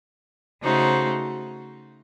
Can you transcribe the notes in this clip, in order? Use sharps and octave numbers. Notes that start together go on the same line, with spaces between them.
C#3 A3 D#4 F#4 C5